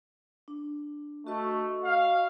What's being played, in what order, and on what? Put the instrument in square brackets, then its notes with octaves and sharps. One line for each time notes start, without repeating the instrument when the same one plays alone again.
[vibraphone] D4
[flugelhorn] A3 [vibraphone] F#4 D#5 C#6
[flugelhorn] F5